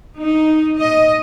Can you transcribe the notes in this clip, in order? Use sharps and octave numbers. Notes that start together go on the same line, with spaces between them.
D#4
D#5